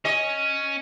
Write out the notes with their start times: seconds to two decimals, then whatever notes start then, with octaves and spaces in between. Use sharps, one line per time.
0.05 C#4 D#5